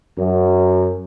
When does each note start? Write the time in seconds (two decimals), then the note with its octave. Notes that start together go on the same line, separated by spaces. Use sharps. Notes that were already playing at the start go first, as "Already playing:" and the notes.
0.17 F#2